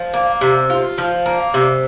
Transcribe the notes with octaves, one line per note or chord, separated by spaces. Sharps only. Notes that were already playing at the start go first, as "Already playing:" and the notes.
Already playing: F3
A#3
C3
F4
F3
A#3
C3